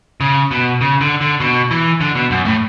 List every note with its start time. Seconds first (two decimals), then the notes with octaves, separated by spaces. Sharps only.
0.20 C#3
0.51 B2
0.81 C#3
1.01 D3
1.21 D3
1.40 B2
1.71 E3
2.00 D3
2.15 B2
2.31 F#2
2.45 A2